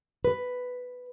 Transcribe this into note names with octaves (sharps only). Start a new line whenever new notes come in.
B4